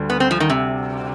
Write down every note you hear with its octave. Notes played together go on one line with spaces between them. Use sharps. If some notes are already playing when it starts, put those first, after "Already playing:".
Already playing: D2 D3 G3
B3
C4
F3
D#3
C3